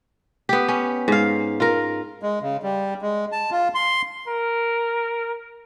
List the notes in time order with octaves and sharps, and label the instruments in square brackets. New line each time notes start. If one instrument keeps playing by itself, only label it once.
[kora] B3 G4
C#4
G#2 F5
F4 A#4
[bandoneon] G#3
C#3
G3
G#3
A5
F4
C6
[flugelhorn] A#4